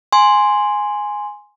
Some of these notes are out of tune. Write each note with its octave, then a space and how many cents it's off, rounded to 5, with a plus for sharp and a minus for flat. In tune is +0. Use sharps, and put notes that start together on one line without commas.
G#5 +0 C6 +0